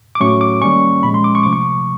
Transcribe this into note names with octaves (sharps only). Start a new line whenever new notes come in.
D6
A2 F#3 A3 C#4 C#6
D6
D#3 G3 A#3 C#4 C#6
A#2 F3 G#3 C#4 B5
C6
D6
C#6
C3 F3 A3 D6
C#6